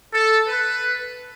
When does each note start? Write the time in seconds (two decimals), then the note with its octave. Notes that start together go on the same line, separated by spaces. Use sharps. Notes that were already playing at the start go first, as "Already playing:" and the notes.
0.14 A4
0.48 B4